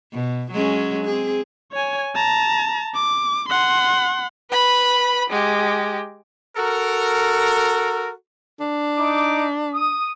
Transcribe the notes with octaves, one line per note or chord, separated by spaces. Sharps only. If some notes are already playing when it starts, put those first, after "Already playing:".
B2
F#3 G#3 C#4
C4 G#4
C#5 G#5
A5 A#5
D6
F#5 C6
B4 B5
G#3 G4
F#4 A4 A#4
D4
D#4 D6
D#6